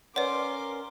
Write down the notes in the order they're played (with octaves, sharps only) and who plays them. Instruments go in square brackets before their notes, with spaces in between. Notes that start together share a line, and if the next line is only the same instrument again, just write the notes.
[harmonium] C#4 A#4 [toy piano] B4 F#5 [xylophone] C#5 D5 [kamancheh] C6 D6